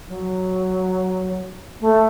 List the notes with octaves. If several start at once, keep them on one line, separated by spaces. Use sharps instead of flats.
F#3
A3